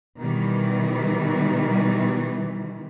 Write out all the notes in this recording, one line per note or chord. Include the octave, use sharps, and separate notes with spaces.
B2 D#3 E3 G3